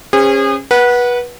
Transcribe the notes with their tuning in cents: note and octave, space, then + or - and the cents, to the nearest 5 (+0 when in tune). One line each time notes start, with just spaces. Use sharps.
C#4 -20 G#4 -35 C5 -40
B4 -25 F#5 +0